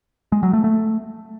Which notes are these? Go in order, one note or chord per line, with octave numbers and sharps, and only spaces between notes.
G#3
F#3
A3
A3